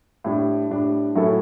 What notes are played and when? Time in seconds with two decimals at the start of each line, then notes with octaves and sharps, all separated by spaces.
0.24 A2 G3 D4
0.70 A2 G3 D4
1.15 A2 F#3 C#4 E4 A4